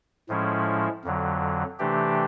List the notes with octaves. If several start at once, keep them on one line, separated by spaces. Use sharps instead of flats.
A2 F3 G#3 C#4 E4
F2 D3 F#3
C3 E3 A3 D4 G4